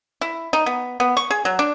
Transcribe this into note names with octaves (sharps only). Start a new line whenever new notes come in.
E4
D#4
B3
B3
C#6
G#4
F#3
D4